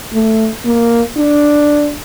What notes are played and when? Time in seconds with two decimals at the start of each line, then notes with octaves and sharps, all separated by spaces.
0.14 A3
0.65 A#3
1.17 D4